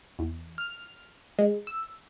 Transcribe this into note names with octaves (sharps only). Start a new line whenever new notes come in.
E2
F6
G#3
E6